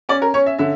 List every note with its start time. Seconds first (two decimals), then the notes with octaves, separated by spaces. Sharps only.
0.09 C#4 D5
0.22 A#4
0.34 C#4 C#5
0.46 E5
0.58 D3 E5